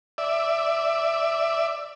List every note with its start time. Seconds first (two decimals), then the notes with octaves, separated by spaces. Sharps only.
0.18 D5 E5